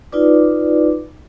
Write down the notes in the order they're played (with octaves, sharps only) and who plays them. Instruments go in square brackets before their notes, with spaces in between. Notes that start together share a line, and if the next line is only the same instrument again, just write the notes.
[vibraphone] D#4 F4 B4 D5 D6